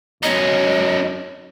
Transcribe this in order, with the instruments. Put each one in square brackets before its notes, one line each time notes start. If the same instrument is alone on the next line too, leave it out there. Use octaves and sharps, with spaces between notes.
[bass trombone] F#2 [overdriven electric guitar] C#4 D#4 [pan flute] D#5